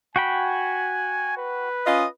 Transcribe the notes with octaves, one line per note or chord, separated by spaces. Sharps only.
F#4 G5 G#5 B5
B4
C#4 F4 D#5